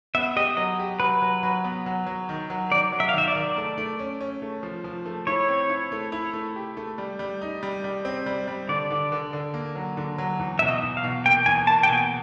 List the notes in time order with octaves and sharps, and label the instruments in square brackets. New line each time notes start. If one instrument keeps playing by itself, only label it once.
[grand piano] B3 [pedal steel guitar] E5
[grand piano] G4 [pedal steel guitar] D#5
[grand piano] F#3 [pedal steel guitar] D#5
[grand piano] G4
[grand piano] F#3 [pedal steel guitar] B4
[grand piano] F#3
F#3
B3
F#3
F#3
D#3
F#3
[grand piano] D#3 [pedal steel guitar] D5
[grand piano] F#3
[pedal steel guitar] E5
F5
[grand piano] D#3 [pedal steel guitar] E5
[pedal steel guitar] D5
[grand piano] D#3
A3
A3
C#4
C#4
A3
F3
F3
A3
[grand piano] E4 [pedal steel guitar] C#5
[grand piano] C4
E4
A3
E4
A3
G4
A3
G3
G3
D#4
G3
G3
C4
G3
G3
[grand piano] D3 [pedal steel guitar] D5
[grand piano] D3
D3
D3
A#3
F#3
D3
F#3
E2
[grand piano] B2 [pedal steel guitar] E5
[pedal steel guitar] D#5
[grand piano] E2
[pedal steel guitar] F5
[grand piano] B2
[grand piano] A#3 [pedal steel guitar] G5
[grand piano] E2 [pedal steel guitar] G#5
[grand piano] A#3 [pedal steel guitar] A5
[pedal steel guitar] G5
[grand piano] B2 [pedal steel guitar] G#5